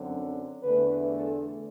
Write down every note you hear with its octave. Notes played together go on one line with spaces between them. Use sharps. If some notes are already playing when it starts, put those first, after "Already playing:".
Already playing: F#2 D3 F#3 C4
E2 D3 A3 B4
A4